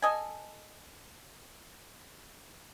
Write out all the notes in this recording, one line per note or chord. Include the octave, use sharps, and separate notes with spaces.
A4 D#5 G#5